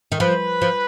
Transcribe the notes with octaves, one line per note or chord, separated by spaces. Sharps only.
D#3
F3 B4
F3